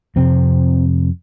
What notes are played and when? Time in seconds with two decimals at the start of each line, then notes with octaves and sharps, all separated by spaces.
0.16 F2 C3 C4